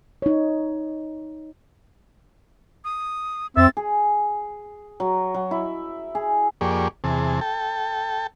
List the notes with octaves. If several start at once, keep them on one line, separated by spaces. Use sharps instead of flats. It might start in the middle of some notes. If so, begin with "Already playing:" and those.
D#4 C#5
D#6
F2 C4 E5 A6
G#4
F#3
F#3
E4
G#4
F2 A#3 G4 G#4 D5 C#6
E2 C3 G#4 A5
A4 G5 A5